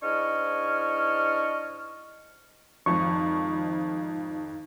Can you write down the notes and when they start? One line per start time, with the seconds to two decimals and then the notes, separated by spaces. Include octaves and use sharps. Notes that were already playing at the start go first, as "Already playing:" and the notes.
0.02 G#2 D4 E4 D#5 C#6 F6
2.86 G#1 F2 D#4 C#6